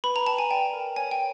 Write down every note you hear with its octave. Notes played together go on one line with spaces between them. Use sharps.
B4 B5
A#5
G5 A5
G#5
D5 G5
A#4
C#5 G#5
G5